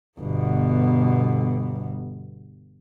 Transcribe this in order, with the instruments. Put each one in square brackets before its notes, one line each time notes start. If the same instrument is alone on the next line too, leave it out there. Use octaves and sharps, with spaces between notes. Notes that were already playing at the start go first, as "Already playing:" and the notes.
[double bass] G1 B2